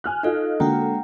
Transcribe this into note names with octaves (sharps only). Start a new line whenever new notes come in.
G#5 F6 F#6
D#4 F4 A4 D#5
D3 G#3 A#3 F#4 F#5 G5 A#5
G5